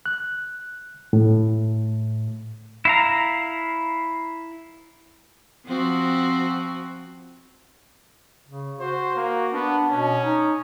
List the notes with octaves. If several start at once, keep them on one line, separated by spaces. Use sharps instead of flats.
F#6
A2
E4 F5 A#5
F3 C4 F#4
C#3
F#4 C5
A#3
B3 D4
B2 C#4
D#4